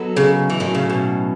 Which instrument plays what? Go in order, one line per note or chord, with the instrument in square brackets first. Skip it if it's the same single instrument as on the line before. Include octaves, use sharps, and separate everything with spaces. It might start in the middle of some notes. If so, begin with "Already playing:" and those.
Already playing: [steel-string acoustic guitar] F#3 B3 D#4 A4
[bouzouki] C#3
E3
[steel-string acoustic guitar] A2 F#3 C#4 [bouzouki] D#3
[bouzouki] C#3
B2